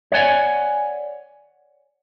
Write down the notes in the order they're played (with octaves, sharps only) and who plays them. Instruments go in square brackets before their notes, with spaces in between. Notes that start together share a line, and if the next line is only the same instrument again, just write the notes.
[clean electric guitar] C#5 D5 F#5 G#5